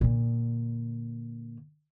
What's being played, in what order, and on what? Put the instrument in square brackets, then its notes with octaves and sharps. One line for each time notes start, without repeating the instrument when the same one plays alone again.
[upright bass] A#2 D3